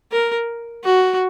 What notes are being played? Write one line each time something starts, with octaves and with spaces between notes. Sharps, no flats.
A#4
F#4